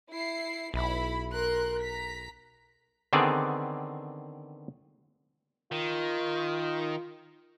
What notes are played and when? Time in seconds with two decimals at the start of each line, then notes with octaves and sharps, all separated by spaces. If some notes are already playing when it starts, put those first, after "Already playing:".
0.11 E4 C7
0.74 B1 E4 B5
1.33 A#4 C6 F#6
1.81 A#5 B6
3.13 D3 D#3 B3 C4 G#4 D5
5.72 D#3 F4